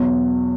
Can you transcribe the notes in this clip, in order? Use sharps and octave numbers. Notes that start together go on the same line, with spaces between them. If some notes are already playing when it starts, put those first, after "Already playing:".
Already playing: E2 B2 F#3